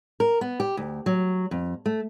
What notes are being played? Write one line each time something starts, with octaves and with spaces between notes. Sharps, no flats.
A#4
B3
G4
D2
F#3
F2
A3